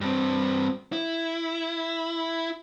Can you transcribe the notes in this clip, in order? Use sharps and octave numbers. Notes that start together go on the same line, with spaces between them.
G2 C4
E4